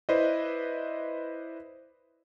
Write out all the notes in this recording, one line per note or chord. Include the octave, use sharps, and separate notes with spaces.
E4 B4 C5 D5 D#5